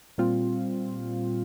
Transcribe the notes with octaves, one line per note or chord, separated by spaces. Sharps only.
A#2 G3 C4 F4